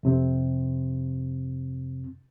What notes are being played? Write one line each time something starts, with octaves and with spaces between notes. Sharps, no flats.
F2 C3 C4